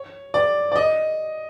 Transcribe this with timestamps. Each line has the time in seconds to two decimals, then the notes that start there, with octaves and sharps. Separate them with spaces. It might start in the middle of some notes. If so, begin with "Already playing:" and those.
Already playing: C#5
0.34 D5
0.72 D5
0.76 D#5